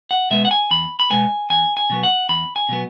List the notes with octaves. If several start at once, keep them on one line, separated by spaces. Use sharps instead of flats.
F#5
B2 G#3 B3 E5
F#5
G#5
E2 B5
B5
B2 G#3 B3 G#5
E2 G#5
G#5
B2 F#3 B3
F#5
E2 B5
G#5
B2 F#3 B3